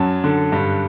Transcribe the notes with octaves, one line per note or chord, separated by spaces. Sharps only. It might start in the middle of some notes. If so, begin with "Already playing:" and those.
Already playing: F#2 F#3 A5
D3
G2